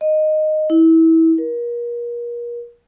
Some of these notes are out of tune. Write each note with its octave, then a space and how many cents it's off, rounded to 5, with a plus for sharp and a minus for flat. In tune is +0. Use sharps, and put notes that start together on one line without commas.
D#5 -10
E4 -25
A#4 +35